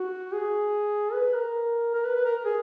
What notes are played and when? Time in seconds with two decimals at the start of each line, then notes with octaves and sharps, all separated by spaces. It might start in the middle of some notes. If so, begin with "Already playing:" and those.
Already playing: F#4
0.33 G#4
1.13 B4
1.34 A#4
1.95 A#4
2.05 B4
2.15 B4
2.25 A#4
2.45 G#4